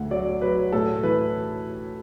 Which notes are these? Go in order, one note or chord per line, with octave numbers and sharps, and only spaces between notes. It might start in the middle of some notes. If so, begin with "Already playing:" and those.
Already playing: D2 D3 F#5
F#3 D5
F#3 B4
A2 A4
E3 B4